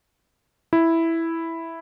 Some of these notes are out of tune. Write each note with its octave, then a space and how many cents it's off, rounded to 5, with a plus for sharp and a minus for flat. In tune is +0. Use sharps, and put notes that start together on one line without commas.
E4 +0